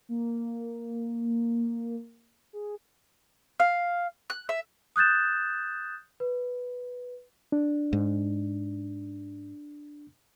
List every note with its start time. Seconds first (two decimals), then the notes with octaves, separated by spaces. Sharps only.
0.09 A#3
2.53 G#4
3.60 F5
4.30 F#6
4.49 E5
4.96 D#6 F#6 G6 A6 E7
6.20 B4
7.52 D4
7.93 G#2